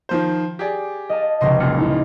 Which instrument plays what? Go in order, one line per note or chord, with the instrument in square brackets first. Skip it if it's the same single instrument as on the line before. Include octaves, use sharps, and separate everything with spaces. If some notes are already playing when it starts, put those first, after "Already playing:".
[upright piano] D#3 F3 C5
G4 G#4 D5
[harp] D#5 F5 A5
[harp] F1 C#2 C3 [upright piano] D#5 C6
[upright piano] F#2 A#2 [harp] C#7
[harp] D#4 E4